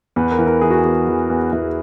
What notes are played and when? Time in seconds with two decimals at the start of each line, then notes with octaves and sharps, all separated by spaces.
0.16 E2 B4
0.31 A#4
0.39 E3
0.47 A#4
0.61 E3 G#4
0.70 F#4
0.79 G#4
0.85 E2
1.07 E3
1.30 E2
1.53 E2 E4